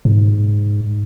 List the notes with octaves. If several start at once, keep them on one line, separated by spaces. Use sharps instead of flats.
G#2